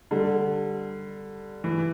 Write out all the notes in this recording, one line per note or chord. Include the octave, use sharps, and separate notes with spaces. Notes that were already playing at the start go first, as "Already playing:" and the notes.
D3 G3
E3